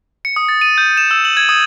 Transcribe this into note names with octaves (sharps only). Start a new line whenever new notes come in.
C#7
D#6
A6
D#7
G6
E7
E6
F#7
G#6
D#6